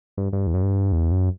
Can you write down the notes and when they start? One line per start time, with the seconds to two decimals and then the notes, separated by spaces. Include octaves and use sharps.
0.17 G2
0.33 G2
0.47 E2
0.54 F#2
0.62 G2
0.92 E2
1.12 F#2